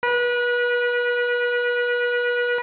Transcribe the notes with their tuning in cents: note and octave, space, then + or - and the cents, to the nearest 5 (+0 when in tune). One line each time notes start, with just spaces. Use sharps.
B4 -30